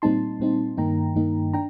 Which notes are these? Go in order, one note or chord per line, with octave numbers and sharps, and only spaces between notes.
A#2 G3 C4 D#4 A5 C6
A#2 G3 C4 D#4
G2 D#3 A#3 D#4 G5 A#5
G2 D#3 A#3 D#4
D4 G5 A#5